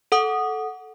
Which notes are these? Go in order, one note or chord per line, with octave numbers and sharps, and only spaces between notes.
A4 F#5 D#6